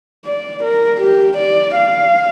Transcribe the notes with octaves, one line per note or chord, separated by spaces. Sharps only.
D5
A#4
G4
D5
F5